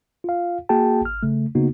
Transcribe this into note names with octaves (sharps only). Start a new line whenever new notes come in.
F4 F5
A#3 F#4 G#4 G5 A5
G#1 F6
C#3 A3
C#3 A#3 B3 D#4 F#4